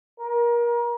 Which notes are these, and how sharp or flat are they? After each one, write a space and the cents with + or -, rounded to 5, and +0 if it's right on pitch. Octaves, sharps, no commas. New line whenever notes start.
A#4 +30